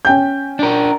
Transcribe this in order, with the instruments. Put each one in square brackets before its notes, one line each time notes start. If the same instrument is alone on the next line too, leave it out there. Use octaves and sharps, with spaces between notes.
[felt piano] C#4 G5 G6
[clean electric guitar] D4 A#4